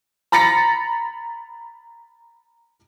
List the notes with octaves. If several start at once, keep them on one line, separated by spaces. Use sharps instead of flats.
A#5 B5 A6 A#6 C#7